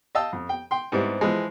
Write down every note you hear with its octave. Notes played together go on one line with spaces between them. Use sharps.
D#5 F5 G5 A5 E6
F2
G5
G5 C6
G#2 G3 B3 C4 E4
E3 F3 G#3